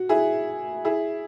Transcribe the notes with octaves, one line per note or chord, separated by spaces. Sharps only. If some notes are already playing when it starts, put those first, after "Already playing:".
Already playing: F#4
E4 G#4
E4 G#4